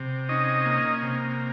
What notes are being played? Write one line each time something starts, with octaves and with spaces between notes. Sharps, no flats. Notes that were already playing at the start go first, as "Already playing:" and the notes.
Already playing: C3
C#4 D#4 D#5
A#3
C3